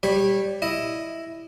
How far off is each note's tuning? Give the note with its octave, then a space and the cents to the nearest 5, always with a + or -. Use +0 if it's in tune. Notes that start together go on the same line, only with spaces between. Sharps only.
G3 +0 C#5 -20 B5 +0
E4 +0 D#5 +0